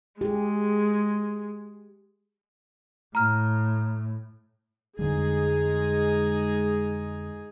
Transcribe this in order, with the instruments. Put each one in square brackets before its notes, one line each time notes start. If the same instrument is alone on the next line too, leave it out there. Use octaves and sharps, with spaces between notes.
[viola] G#3 [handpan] G4 G#4
[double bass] A2 [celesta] A#5 F6
[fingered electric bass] F2 D3 G3 [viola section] G#3 D#4 G#4